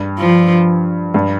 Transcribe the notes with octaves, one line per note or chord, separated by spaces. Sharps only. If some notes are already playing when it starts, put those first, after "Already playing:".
Already playing: G2
F3
G2